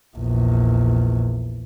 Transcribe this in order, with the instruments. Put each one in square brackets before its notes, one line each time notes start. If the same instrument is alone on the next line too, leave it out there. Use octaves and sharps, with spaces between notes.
[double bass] A#1 E2